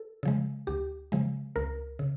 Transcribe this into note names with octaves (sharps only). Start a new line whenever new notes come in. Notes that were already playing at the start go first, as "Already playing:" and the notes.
Already playing: A4
C#3 F3 G#3
D2 G4
C#3 F3 G#3
C#2 A#4
C#3